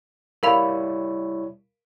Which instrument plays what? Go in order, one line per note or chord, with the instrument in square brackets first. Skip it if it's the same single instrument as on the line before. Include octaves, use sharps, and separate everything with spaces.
[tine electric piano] G3 E4 C#5 [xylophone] A#4 F5 B5